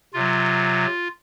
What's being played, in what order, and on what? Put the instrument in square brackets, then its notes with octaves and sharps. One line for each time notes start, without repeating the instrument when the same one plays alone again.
[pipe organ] C3 F#3 F4